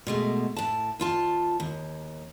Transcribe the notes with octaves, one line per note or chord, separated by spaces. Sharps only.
B2 G#3 A3
A2 A5
D#2 F4 A5
D#2